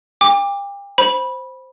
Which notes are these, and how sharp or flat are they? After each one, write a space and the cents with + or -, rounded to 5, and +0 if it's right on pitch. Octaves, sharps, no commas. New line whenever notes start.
G5 +40 D6 +0
C5 +0 B5 -15